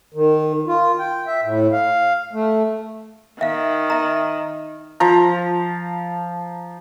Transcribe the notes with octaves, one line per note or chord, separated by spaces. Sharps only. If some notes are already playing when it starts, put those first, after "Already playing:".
D#3
F4
G5
E5
A2
F5
A3
D#3 E5 F5
E5 A#5
F3 A#5